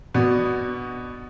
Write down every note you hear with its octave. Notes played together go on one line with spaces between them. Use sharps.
B2 B3 D4 F#4